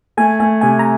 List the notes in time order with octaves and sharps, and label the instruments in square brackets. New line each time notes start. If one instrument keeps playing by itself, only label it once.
[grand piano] A3 [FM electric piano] G#5
[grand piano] A3 [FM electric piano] G#5
[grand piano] C3 [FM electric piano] G#5
[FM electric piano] A#5